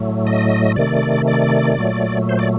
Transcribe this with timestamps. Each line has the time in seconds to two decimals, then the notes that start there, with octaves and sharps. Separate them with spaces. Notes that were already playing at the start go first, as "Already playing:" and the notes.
Already playing: A2 F#3 A3
0.27 D#5
0.76 C3 D#3 A3 D5
1.27 D5
1.78 A#2 F#3 A3
2.29 C5
2.39 D5